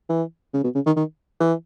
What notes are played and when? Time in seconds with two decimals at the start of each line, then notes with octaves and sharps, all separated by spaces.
0.10 E3
0.54 C#3
0.64 B2
0.75 C#3
0.86 D#3
0.97 D#3
1.40 E3